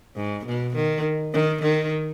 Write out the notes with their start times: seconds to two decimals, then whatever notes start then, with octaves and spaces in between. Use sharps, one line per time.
0.16 G#2
0.46 B2
0.75 D#3
1.33 D#3
1.62 D#3